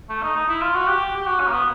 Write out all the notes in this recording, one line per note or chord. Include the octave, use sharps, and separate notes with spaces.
A3
D#4
D#4
E4
F4
F#4
G4
G4
F#4
C#4
A#3
B3